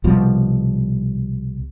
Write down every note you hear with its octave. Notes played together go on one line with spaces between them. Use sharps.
C2 B2 F3 G3